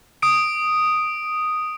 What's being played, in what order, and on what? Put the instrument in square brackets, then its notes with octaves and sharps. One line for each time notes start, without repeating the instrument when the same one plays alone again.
[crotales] D#6 D7